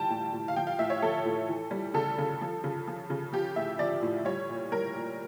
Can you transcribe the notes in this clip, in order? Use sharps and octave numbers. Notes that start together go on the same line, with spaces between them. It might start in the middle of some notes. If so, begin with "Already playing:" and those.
Already playing: E3 G3 G5 A5
A2
A2
F5
F3 G5
F5
A2 E5
C#5
F3 A4
A2
E3
G3
C#3 A4
C#3
F3
C#3
F3
C#3
F3 G4
A2 E5
F3 D5
A2
G3 C#5
A#2
G3 A#4
A#2